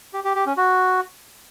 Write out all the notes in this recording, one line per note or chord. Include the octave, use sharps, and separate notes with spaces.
G4
G4
G4
C#4
F#4